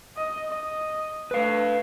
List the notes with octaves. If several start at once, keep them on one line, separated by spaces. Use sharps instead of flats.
D#5
D#5
A3 B4 F5